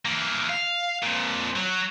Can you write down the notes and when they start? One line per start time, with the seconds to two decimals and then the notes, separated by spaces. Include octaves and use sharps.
0.05 E3 A#3
0.50 F5
1.03 F2 A#2
1.56 F#3